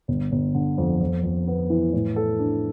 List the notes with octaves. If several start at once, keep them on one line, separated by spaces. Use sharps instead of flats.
G1
G1
D3
F2
F2
F2
B3
E3
A2
A4
D4